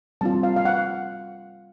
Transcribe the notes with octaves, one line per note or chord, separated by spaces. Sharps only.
G3 C4 F4 A5
F5
F5
F#5